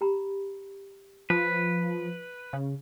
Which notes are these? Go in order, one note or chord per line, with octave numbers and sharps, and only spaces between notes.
G4 A#5 B5
F3 B4
C#3